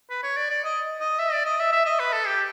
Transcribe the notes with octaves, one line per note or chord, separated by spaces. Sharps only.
B4
C#5
D5
D5
D#5
D#5
E5
D5
D#5
E5
E5
D#5
B4
A4
G4